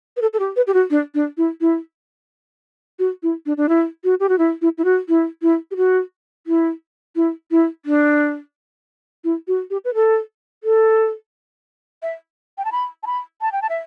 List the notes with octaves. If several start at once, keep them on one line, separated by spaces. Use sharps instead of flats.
B4
A4
A4
G4
B4
G4
F#4
D4
D4
E4
E4
F#4
E4
D4
D4
E4
F#4
G4
F#4
E4
E4
E4
F#4
E4
E4
G4
F#4
E4
E4
E4
D4
E4
F#4
G4
B4
A4
A4
E5
G5
A5
B5
A5
B5
A5
G5
A5
E5